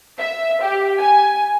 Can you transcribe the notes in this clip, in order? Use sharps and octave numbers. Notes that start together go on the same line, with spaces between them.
E5
G4
G#5